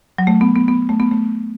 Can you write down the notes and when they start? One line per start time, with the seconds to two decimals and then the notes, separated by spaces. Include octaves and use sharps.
0.18 F#3
0.27 A3
0.41 B3
0.55 B3
0.68 B3
0.89 A3
1.00 B3
1.11 A3